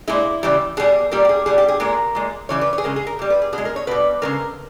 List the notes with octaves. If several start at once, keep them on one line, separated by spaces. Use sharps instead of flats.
A#2 G#3 E4
C#3 E3 G3
B2 G3 G#4
A#2 G3 A#4
G4
G#4
B2 G3 G#4
G4
G#4
A#2 G#3 A#4
A#2 G#3
C#3 E3 G3 C#5
B4
C#5
G#4
C#3 G#3 A#4
G#4
A#4
A#2 G3
B4
G#4
B2 G#4
G#3
A#4
C#5
B2 G3 B4
C#3 E3 G#3 A#4